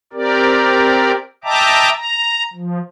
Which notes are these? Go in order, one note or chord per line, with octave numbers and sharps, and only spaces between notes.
C4 G4 A#4 D5
D#5 E5 G5 A5 A#5 D6
A#5
F3